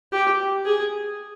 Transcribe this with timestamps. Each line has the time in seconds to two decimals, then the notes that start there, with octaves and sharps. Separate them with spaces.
0.13 G4
0.66 G#4